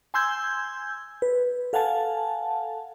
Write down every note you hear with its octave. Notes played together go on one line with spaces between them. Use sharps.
G#5 C6 E6 G6 G#6
B4
A4 F5 F#5 G#5 A5